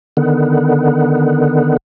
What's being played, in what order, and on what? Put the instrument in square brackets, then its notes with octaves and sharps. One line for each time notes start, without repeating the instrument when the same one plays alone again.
[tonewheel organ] D3 D#3 B3